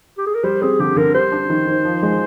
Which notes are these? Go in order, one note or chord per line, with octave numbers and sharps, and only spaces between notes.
G4
G#4
A#4
G3 C5
C4 G#4
D3 G4
D3 A#4
G3 C5
D4
D#3
D#3
F3
G#3